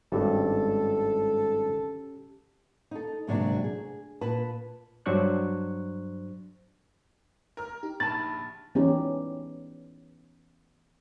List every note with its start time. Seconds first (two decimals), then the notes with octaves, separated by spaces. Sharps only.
0.12 G#1 G2 C#4 G4 A4
2.91 D#4 A4
3.27 D2 G#2 C3 F#3 A#3 D4
3.64 G#4
4.21 A#2 B4 A5
5.06 G2 F#3 D4 C5 C#6 F#6
7.57 A#4 F6
7.83 D#4 G4
8.00 A#1 A5 B5 A6
8.75 E3 B3 C#4 D#4 G4